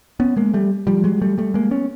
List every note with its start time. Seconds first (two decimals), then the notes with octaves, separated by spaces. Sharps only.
0.20 B3 C#4
0.36 G#3 A#3
0.54 G3 A3
0.87 F3 G3
1.04 F#3 G#3
1.22 G3 A3
1.38 G3 A3
1.54 G#3 A#3
1.71 B3 C#4